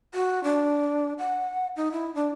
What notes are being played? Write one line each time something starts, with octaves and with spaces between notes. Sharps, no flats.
F#4
D4
F#5
D#4
E4
D4